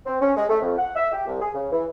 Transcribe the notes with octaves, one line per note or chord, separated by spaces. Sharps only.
C4
C#4
G#3
A3
F2
F#5
E5
G4
C2
G#4
C#3
E3